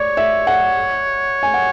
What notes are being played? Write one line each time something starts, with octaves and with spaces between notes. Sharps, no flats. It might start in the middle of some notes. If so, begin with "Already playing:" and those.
Already playing: C#5 D5
E5
F#5
G#5
F#5